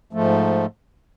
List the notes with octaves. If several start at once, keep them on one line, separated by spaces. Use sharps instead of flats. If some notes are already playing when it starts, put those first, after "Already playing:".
G#2 F3 A3